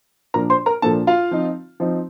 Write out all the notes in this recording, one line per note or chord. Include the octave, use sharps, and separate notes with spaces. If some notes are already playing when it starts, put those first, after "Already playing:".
A#2 F3 A#3 D4 A#4 A#5
C5 C6
A#4 A#5
A#2 F3 A#3 D4 A4 A5
F4 F5
F3 C4 D#4
F3 C4 D#4